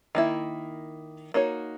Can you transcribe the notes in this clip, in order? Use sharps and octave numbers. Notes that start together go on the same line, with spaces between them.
D#3 A#3 E4
A#3 D#4 F#4 C#5